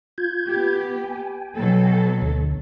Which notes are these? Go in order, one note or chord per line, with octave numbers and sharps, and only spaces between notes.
F4 G6 G#6
B3 G4
G5 G#5
B2 F#3 A4
D2 D3